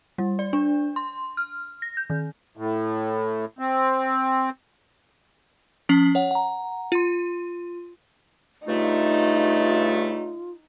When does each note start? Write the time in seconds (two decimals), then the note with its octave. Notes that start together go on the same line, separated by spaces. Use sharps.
0.18 G3
0.39 D5
0.53 D4
0.96 C6
1.37 F6
1.82 A#6
1.97 G6
2.10 D#3
2.57 A2
3.59 C4
5.89 F3 C#4 C7 F#7
6.15 C#5 F#5
6.31 F#5 A#5
6.92 F4 C6
8.67 G2 C#3 A3 D#4 F4